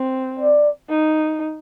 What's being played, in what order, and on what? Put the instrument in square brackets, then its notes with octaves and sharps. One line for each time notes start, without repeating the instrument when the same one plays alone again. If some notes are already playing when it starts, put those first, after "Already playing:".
Already playing: [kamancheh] C4
[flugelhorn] D5
[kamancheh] D#4